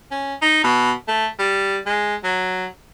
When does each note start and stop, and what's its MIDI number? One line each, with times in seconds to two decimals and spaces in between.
0.11 0.34 61
0.42 0.63 63
0.64 0.91 47
1.08 1.27 57
1.39 1.78 55
1.86 2.15 56
2.24 2.66 54